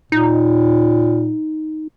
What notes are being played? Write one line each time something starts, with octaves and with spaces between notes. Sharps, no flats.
A#2 D#4